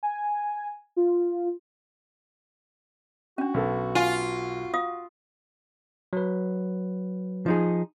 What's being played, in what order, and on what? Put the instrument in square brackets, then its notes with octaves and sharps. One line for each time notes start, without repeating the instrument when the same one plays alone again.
[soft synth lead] G#5
F4
[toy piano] C#4 D4 [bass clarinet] F#4
[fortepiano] B1 A4
[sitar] F4 [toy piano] G#5
[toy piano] F4 F5 D#6
[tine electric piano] F#3 B4
[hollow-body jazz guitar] F3 D#4 G#4